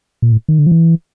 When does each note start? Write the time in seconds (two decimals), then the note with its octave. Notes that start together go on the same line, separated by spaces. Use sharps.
0.22 A#2
0.32 A2
0.49 D#3
0.59 D3
0.67 F3
0.72 E3